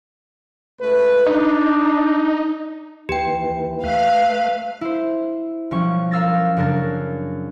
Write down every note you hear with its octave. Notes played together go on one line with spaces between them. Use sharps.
C#2 A3 B4
D4 D#4
D#2 E3 G4 G5
A3 B4 F5
E4 C5
B1 F3 G3 C#4 C#6
A#4 F5 E6 A6 A#6
F#2 C#3 D4 A#4 A6